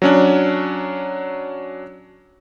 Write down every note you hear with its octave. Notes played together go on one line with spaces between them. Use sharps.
F#3 C#4 D4